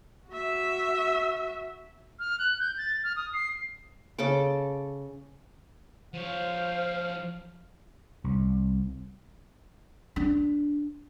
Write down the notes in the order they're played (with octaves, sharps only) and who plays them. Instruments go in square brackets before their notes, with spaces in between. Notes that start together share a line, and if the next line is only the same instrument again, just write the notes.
[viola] F#4 E5
[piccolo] F6
F#6
G6
A6
F6
D#6
C7
[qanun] C#3 A4 A5 D6
[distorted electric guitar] F3 C#5 [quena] C5 [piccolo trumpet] F5
[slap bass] C2
[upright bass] D4